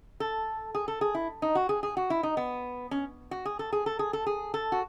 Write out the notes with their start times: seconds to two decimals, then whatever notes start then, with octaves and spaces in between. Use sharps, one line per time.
0.20 A4
0.75 G#4
0.88 A4
1.01 G#4
1.15 E4
1.42 D#4
1.55 F#4
1.69 G#4
1.83 G#4
1.97 F#4
2.10 E4
2.23 D#4
2.37 B3
2.91 C#4
3.31 F#4
3.45 G#4
3.59 A4
3.72 G#4
3.86 A4
3.99 G#4
4.13 A4
4.26 G#4
4.54 A4
4.72 F#4